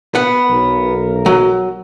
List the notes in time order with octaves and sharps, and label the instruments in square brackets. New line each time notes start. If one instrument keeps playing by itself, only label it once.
[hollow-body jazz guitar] B3 F#5
[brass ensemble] B1 A#4
[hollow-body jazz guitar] F#3